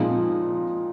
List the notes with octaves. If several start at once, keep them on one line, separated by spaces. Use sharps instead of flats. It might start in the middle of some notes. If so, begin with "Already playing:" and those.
Already playing: A#2 F3 G#3 C4 D#4